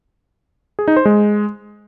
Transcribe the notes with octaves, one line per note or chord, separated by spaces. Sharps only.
G#4
D#4
C5
G#3